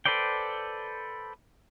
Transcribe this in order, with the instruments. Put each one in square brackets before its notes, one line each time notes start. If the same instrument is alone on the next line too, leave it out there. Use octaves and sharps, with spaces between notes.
[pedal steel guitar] A4 B4 C5 D5 G5